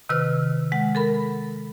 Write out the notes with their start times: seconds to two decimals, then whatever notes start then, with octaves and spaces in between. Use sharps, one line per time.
0.09 C3 D#3 B4 E6 F6
0.72 G#3 F#5
0.95 A4 A#4 B5